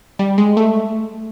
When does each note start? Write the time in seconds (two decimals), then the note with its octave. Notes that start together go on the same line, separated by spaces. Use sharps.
0.19 G3
0.38 G#3
0.57 A3